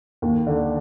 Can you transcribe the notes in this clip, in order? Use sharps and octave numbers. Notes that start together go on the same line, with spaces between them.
D#2
D3